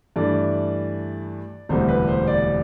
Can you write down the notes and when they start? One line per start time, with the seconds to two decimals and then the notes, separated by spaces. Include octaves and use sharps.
0.16 G2 E3 A3 D4 D5
1.69 E1 D2 C3 E3 G3 C5
1.89 B4
2.08 C5
2.27 D5